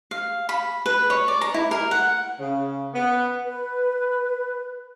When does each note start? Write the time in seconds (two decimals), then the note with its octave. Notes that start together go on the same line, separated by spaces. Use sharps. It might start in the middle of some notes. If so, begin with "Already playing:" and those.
0.11 F5
0.49 B5
0.86 B4
1.10 C#5
1.28 D5
1.41 A#5
1.54 E4
1.71 A#4
1.91 F#5
2.40 C#3
2.94 B3
3.45 B4